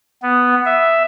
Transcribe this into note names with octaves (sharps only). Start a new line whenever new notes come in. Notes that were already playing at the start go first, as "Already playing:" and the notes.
B3
E5